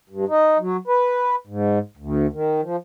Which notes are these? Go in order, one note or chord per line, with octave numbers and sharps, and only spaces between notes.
G2
D#4
F#3
B4
G#2
D2
D#3
F3